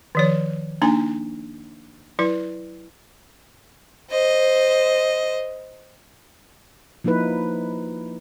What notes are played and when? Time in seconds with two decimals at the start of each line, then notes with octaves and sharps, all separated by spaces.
0.15 D#3 F3 C#5
0.82 A#3 D4 D#4 G#5
2.19 F#3 E4 B4
4.10 C5 D#5
7.04 F3 A#3 D#4 E4 B4